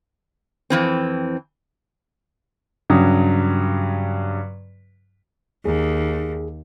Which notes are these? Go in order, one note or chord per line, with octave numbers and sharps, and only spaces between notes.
F2 E3 C4
G2 C#3 F#3 D#6
D#2 G#4